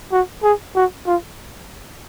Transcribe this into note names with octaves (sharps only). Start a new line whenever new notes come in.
F#4
G#4
F#4
F4